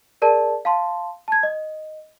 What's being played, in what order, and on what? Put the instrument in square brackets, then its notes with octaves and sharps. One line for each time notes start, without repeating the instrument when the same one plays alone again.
[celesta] G#4 A#4 D5 A5
F5 A5 C6
A5 G#6
D#5